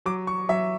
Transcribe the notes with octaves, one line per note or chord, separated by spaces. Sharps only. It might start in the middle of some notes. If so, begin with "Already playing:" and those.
F#3 D6
C#6
F#3 E5